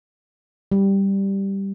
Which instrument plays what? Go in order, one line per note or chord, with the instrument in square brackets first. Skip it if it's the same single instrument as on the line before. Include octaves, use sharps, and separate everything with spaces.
[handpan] G3